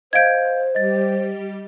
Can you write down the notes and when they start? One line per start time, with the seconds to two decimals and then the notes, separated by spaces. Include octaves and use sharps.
0.13 C5 D#5 F5 G6 G#6 D7
0.75 G3 G4 D#5 A6